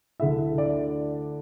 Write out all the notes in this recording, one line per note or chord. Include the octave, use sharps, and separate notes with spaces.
D2 D3 A3 E4 E5
D5